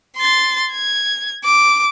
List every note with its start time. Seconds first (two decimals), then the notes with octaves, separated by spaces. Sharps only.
0.18 C6 A6
0.72 G#6
1.44 D6